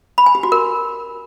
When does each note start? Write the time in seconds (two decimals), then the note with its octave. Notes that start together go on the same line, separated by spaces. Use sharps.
0.18 B5
0.26 G#5
0.35 G4
0.43 F#4
0.52 A#4